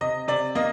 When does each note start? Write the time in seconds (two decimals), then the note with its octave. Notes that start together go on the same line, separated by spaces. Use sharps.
0.01 C3 D#5
0.28 C3 D5
0.55 A#3 D#5